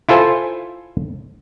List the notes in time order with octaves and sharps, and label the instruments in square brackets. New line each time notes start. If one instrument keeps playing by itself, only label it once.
[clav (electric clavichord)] E4 F4 A4 C5 G#5